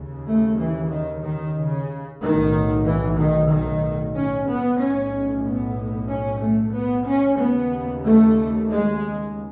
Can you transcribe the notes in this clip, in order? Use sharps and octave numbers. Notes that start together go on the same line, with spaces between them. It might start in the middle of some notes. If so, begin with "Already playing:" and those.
Already playing: D#2 C#3
A3
E3
D#3
D#3
C#3
B1 A2 D#3
E3
D#3
D#3
C#4
B3
B1 A2 C#4
B3
C#4
A3
B3
C#4
D#2 C#3 B3
A3
G#3